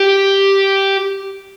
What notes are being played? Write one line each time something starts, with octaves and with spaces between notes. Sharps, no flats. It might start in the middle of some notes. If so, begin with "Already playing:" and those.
Already playing: G4